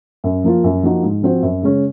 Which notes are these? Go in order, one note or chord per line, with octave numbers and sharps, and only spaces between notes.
F#2
F3 A#3 F4
F#2
F3 A#3 D#4 F#4
G#2
F3 C4 F#4 C5
F#2
C#3 G#3 C#4